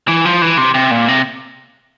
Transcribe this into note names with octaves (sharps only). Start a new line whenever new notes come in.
E3
F3
E3
C3
C3
A#2
C3